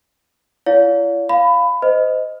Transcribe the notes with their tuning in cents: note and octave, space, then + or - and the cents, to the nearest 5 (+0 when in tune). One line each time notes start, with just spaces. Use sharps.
E4 +45 C#5 +45 F5 +30
F5 +0 B5 +20
C5 -30 D#5 +0